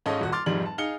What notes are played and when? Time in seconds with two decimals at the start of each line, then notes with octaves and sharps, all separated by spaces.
0.06 G#2 C#4 D#4 F4 A4 D#5
0.21 D#1 F#4
0.32 C6 D6 F6 A6
0.46 F1 F2 G#2 G3 F#7
0.65 A5
0.78 D#4 G#4 F5 F6 C#7 G7